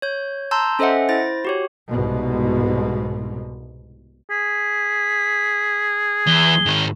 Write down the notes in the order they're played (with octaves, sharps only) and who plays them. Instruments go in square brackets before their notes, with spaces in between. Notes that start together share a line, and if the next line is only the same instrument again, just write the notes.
[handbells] C#5 G6
A5 A#5 C6 E6 G6
C#4 A4 C5 D#5 E5 F#5
E4 C5 A6 A#6
F#4 G4 C#5
[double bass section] C2 G#2 B2
[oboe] G#4 [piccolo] B6
[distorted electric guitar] E2 [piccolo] G7
[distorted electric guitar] G#2 D#3